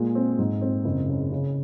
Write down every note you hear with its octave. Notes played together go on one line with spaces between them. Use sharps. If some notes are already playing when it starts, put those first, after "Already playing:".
Already playing: A#2 G#3
C4
G#2
C4
F#1
C#3
C#3